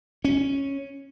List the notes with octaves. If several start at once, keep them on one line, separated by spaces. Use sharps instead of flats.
C#4